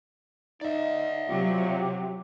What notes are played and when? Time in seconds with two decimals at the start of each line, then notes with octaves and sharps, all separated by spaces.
0.61 D#4 D5 E5
1.29 C3 F#3 F4 G4